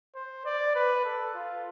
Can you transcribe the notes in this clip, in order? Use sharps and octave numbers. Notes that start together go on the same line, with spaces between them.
C5
D5
B4
A4
F4